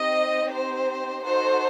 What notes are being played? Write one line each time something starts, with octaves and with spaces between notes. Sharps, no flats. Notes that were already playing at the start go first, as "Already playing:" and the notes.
Already playing: C4 D#4 G4 D#5
C5
D#4 F#4 A4 C5